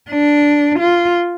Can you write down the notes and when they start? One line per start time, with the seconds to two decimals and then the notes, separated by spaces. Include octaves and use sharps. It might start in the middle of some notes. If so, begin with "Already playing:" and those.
0.10 D4
0.79 F4